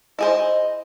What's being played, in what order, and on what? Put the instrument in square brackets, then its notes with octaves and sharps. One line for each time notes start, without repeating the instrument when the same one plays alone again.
[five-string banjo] E4 G#4 C5 [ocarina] D#5